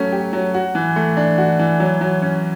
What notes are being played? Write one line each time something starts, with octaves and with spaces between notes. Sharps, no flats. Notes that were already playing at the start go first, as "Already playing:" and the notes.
Already playing: F#3 A3 C#4
G4
F#3
F#4
E3
A3
D4
F#4
E3
F#3
F#3
C#4